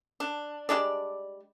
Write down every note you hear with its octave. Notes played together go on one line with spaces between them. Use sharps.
D4
G3 G#3 D4 D5